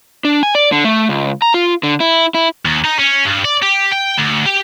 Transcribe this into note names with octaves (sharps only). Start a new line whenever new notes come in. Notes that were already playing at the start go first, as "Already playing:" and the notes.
D4
G#5
D5
D3
A3
C#2
A#5
F4
D3
E4
E4
D#2
D#4
C#4
G2
D5
G4
G5
D2
G4